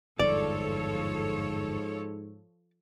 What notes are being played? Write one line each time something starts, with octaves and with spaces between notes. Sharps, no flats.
G1 E2 G#2 F3 A4 C#5 D5